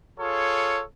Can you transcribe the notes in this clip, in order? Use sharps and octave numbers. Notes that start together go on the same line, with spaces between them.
F4 G#4 A4 C#5